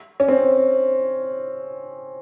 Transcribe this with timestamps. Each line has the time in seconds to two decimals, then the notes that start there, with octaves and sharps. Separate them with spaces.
0.20 C#4
0.28 C4